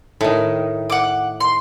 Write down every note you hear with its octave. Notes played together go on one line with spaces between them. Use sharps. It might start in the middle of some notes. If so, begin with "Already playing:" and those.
A2 D#3
F#5 D6
C6